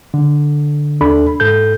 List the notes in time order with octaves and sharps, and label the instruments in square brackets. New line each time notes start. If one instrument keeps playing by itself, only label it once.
[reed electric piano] D3
D#2 D4 A4 B5
G#2 A4 G6